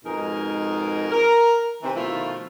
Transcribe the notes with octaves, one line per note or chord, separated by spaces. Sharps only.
F2 G#2 B2 D#4 G#4 A#4
A#4
C3 D#3 E3 C4
B2 D#3 F3 A3 E4 F4